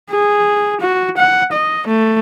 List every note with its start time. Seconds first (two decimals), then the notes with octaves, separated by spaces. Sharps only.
0.11 G#4
0.81 F#4
1.17 F#5
1.52 D#5
1.87 A3